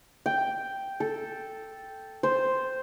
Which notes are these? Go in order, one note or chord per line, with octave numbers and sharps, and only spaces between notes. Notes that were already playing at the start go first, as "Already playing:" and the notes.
G5
A4
C5